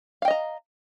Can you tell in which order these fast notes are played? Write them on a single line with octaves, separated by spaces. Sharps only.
F5 G5 D#5 A#5